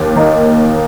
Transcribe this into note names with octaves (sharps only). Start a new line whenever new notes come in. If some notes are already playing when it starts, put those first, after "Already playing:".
Already playing: D#2
D#3 A#3 D#4